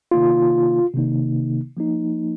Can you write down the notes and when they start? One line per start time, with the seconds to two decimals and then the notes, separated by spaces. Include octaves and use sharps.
0.11 C3 D#3 A#3 D#4 F4
0.94 C3 D#3 A#3 D#4
1.77 F3 A#3 D#4